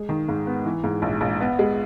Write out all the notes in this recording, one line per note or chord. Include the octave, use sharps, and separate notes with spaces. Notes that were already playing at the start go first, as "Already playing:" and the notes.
Already playing: G#3
D#3
G#2
B3
E3
G#2
A#1
A#1
B3
G#3